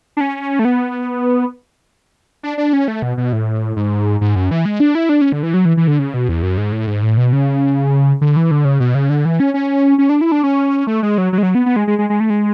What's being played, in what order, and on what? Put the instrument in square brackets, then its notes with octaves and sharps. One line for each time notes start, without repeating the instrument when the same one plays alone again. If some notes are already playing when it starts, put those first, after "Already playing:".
[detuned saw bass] D4
C#4
A3
B3
D4
D4
C#4
A3
B2
B2
A2
G#2
G#2
F#2
E3
G#3
D4
E4
D4
C#4
D3
E3
F#3
E3
E3
D3
C#3
B2
E2
F#2
G#2
A2
G#2
A2
B2
C#3
D3
E3
D3
C#3
B2
C#3
D3
E3
C#4
C#4
C#4
D4
E4
D4
C#4
A3
G#3
F#3
F#3
G#3
F#3
B3
B3
G#3
G#3
G#3
G#3
A3
G#3